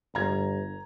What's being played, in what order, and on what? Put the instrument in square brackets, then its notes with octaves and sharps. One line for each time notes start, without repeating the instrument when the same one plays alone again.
[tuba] G1 [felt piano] A#5 G#6